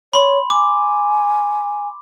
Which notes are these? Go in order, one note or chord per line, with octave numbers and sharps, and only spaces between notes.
C#5 B5 C6
G#5 D6